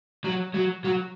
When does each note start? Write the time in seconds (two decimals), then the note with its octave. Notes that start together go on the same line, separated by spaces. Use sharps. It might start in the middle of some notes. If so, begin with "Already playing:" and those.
0.24 F#3
0.54 F#3
0.84 F#3